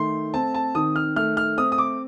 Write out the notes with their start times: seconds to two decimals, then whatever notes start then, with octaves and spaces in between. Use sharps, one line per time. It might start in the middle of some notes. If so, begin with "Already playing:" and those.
Already playing: D#3 A3 C6
0.34 C4 A5
0.54 A5
0.75 D#3 D#6
0.96 F6
1.16 A3 F6
1.37 F6
1.58 C4 D#6
1.72 D#6
1.78 D6